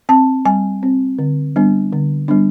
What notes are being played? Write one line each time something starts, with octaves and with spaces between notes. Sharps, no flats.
C4 A5
G3 G#5
C4
D3
G3 B3 D4
D3
G3 B3 D4